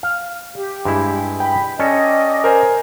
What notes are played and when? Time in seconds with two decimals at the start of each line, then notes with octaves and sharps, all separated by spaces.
0.03 F5
0.55 G4
0.85 G2 G#3 E4
1.40 G5 B5
1.79 C#4 A4 D5 D#5
2.44 A#4 C5 G#5